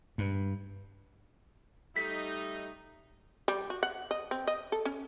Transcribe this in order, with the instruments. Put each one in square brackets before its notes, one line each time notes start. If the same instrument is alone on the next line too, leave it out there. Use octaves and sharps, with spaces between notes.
[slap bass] G2
[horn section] G3 A3 D#4 [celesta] B6
[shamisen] G3
F#4
F#5
D#5
C4
D#5
A4
C#4